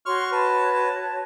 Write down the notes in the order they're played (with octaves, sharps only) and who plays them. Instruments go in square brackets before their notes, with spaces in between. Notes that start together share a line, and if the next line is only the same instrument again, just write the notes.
[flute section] F#4 C#5 [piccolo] C6 [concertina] C#6 F6
[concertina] B4 [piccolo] A5